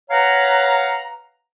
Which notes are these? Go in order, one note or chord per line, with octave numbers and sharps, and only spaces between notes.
B4 C#5 F5 F#5 A#5